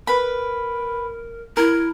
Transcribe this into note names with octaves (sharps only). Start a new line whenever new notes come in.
A#4 B4 B5
E4 A#4